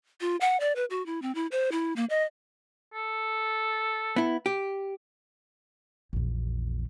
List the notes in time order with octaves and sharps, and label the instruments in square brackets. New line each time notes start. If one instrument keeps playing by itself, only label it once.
[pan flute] F4
F#5
D5
B4
F#4
E4
C4
E4
C5
E4
A#3
D#5
[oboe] A4
[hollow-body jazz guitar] B3 E4
G4
[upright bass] A#1 E2